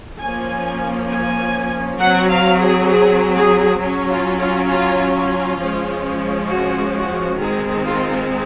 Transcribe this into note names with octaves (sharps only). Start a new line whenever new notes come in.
F3 A#3 C#4 G#5
G#5
F#3 C4 F#5
F5
G#4
G#4
G#4
F#3 C#4
F4
F4
F4
F4
F3 G#3 C#4
F#4
F#4
D#3 G#3 C4 G#4
F4